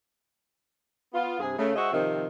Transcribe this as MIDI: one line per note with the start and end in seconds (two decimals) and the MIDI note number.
1.14 1.40 59
1.14 1.40 65
1.40 1.54 43
1.40 1.54 48
1.40 1.54 68
1.59 1.75 49
1.59 1.75 57
1.76 1.88 56
1.76 1.88 66
1.76 1.88 72
1.76 1.88 75
1.76 1.88 76
1.92 2.26 48
1.92 2.26 51
1.92 2.26 53
1.92 2.26 60